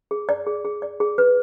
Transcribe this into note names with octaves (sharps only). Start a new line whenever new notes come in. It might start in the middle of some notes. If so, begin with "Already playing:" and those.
G#4
D5
G#4
G#4
D5
G#4
B4